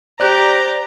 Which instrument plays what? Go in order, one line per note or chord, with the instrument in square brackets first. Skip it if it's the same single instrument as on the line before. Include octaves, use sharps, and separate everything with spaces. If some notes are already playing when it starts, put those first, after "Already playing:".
[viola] G4 [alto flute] C5 [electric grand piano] D5 F#6 [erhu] A#5